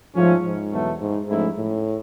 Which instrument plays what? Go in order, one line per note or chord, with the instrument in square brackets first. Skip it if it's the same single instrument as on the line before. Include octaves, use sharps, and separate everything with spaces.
[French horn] G#2 [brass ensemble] F3 A3 C#4
[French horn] G#2
[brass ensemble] E2 B2 F#3 A3
[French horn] G#2
[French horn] G#2 [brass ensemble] F3 A3 C#4 E4
[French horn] A2